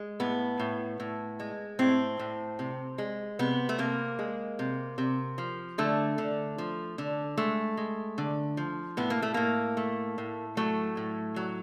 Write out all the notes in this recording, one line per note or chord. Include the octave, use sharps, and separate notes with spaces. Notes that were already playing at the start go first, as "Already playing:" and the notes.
Already playing: G#3
A2 B3
A2
A2
G#3
A2 C4
A2
C3
G#3
C3 B3
A3
C3 A#3
G#3
C3
C3
F3
D3 A3
D3
F3
D3
G#3 A3
G#3
D3
F3
A2 B3
A#3
A3
A2 A#3
A3
A2
F#3 A3
A2
F#3